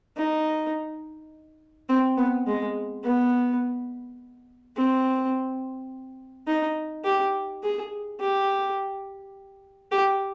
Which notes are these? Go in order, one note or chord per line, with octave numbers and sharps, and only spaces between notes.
D#4
C4
B3
G#3
B3
C4
D#4
G4
G#4
G4
G4